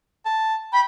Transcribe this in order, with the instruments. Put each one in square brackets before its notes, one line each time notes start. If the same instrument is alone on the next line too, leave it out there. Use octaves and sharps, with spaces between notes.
[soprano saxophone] A5
[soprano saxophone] G5 [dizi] B5